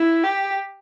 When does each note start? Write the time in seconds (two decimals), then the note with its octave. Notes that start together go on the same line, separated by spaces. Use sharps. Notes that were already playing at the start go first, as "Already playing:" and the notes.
Already playing: E4
0.24 G4